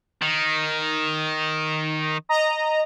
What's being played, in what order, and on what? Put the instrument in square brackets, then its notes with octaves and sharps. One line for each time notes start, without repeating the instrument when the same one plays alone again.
[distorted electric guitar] D#3
[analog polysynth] D#5 A#5